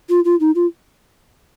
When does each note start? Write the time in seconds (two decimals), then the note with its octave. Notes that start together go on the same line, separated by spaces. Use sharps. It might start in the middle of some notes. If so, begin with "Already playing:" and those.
0.09 F4
0.25 F4
0.40 D#4
0.55 F4